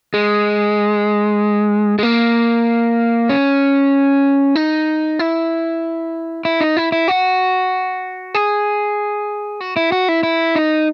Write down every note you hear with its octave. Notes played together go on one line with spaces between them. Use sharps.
G#3
G#3
A#3
C#4
D#4
E4
E4
D#4
E4
E4
F#4
G#4
F#4
E4
F#4
E4
E4
D#4